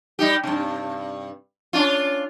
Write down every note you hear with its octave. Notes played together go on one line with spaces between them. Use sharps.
G3 D#4 G4
G2 C3
C#4 D4 F4